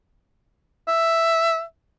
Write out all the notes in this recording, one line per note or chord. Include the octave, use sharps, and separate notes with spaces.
E5